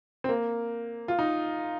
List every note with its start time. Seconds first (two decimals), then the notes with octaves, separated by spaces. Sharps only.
0.24 C4
0.29 A#3
1.08 F4
1.19 D#4